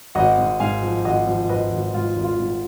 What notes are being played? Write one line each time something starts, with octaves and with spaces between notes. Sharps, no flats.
G#1 D#5 F#5
G#2
G#2 F5 G#5
F3
G#1 D#5 F#5
F3
G#1 B4 D#5
G#1
G#2 F4
G#1
F4
G#2